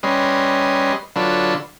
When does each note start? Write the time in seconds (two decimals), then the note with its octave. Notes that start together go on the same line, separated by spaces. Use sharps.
0.03 G3 C#4 B4 D#5 C6
1.16 D3 F#3 D4 F4 A4 B4